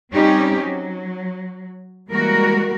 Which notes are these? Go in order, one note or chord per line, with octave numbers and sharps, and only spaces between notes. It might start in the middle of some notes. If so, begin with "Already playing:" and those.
G3 C4 C#4 D#4 G4
F#3
E3 G3 G#3 A#3 F#4 A#4